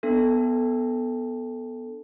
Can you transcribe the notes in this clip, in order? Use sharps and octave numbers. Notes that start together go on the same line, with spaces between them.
B3 D4 A4